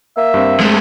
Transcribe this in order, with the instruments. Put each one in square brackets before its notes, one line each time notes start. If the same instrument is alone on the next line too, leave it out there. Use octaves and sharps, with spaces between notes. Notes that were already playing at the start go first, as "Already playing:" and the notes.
[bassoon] A#3 [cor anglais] E5
[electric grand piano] G2 C4
[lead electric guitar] G#3 A3